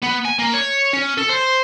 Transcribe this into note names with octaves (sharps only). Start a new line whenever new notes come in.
B3
G#5
A#3
C#5
C#4
A4
C5